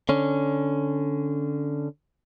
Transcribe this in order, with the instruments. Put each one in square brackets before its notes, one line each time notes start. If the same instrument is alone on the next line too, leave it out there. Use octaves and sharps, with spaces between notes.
[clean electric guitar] D3 C#4